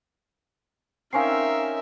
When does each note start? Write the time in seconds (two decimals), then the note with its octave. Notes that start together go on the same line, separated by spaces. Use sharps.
1.13 C4 C#4 D#4 A#4 E5 F5 G#5 C7